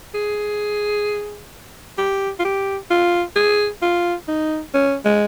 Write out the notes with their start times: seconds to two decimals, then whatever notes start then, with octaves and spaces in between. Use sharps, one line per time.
0.14 G#4
1.98 G4
2.39 F4
2.45 G4
2.90 F4
3.36 G#4
3.82 F4
4.28 D#4
4.74 C#4
5.05 G#3